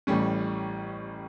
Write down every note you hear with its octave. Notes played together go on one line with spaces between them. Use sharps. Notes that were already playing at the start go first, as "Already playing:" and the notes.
A1 A2 G3 C#4